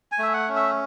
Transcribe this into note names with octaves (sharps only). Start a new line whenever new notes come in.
G#5
A3 E5
F#5
C#4
E5